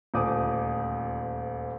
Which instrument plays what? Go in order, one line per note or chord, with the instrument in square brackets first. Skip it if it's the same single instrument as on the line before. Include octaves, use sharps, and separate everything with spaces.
[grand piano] D#1 D2 C5 D6 D#6